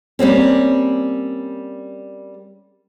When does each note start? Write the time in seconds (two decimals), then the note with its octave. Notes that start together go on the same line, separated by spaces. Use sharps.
0.19 G3 A#3 C4 C#4